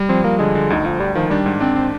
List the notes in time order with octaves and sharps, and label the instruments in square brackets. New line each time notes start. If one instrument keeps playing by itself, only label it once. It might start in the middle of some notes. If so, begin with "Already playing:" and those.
Already playing: [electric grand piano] G3
[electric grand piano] F3 [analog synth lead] C4
[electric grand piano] F3 [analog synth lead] A#3
[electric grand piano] D3 [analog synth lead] G#3
[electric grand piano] D3
[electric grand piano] D2 [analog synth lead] D#3
[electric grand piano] D2 [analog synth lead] F3
[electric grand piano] D2 [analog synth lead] G3
[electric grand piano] D#3 [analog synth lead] F3
[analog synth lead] G3 [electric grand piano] D4
[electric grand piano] G#2
[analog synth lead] C4 [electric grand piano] D4
[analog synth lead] C4